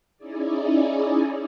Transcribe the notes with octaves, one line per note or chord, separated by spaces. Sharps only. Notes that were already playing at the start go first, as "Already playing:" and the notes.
C#4 D#4 E4 G#4 D5